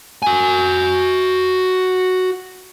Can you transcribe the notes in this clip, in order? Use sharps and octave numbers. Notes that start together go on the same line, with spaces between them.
F#4 G#5